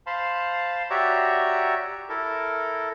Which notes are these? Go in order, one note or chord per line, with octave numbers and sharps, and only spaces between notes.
C5 F5 A5 B5 C6
F#4 G4 C#5 D5 E5 A#5
E4 A4 A#4